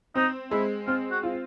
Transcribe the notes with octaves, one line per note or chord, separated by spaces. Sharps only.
C4 D#4
G#3 E4
C4 F4
F#4
F4